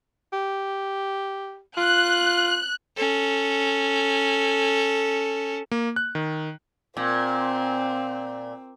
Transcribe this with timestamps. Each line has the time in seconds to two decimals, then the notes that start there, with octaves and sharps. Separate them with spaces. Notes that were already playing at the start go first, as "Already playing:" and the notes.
0.33 G4
1.77 F4 F#6
2.96 C#4 A4
5.71 A#3
5.96 F#6
6.15 D#3
6.97 A#2 C4